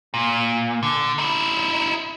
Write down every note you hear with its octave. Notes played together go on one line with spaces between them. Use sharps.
A#2
D3
D#4 E4